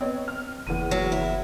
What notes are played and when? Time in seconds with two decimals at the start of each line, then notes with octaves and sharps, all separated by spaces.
0.01 B3 C4 C#5 D#5
0.28 F6
0.67 F#1 E2 D#7
0.91 F#3
1.12 E4